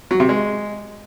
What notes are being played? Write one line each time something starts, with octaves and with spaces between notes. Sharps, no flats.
F#3
C3
G#3